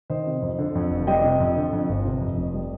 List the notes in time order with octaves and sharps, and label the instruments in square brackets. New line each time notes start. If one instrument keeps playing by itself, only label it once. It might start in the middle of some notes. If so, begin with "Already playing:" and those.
[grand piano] D#3 C5 D#5
C3
F2
D3
F2
F1
G3 D#5 G5
C3
F2
D3
F2
G1
C3
F2
F1
G3